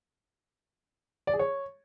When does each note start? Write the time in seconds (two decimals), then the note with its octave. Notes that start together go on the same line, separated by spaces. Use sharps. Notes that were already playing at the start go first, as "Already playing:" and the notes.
1.27 D5
1.33 G#4
1.39 C#5